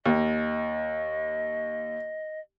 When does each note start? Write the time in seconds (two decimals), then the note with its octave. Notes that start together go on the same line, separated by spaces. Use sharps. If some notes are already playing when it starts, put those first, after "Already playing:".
0.06 D#2 D#5